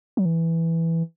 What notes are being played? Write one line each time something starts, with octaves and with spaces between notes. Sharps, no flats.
F#3
E3